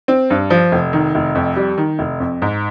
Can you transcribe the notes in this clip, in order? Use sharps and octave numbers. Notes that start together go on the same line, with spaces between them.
C4
G2
F3
F1
D#3
F1
F2
G3
D#3
F1
F2
G#2